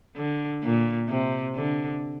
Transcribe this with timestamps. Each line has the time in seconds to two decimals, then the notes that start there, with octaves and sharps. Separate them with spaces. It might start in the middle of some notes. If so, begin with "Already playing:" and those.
0.16 D3
0.63 A#2
1.09 C3
1.55 D3